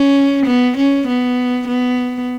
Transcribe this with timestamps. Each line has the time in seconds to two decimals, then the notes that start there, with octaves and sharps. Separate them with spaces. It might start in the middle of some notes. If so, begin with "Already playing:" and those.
Already playing: C#4
0.46 B3
0.77 C#4
1.08 B3
1.68 B3